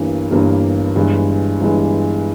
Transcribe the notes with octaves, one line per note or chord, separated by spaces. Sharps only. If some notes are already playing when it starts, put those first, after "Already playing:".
Already playing: G1 G2 E3 G3 A#3
G1 G2 E3 G3 A#3
G1 G2 E3 G#3
G1 G2 E3 G#3